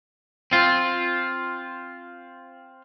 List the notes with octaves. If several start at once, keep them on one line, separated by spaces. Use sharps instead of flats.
C4 F4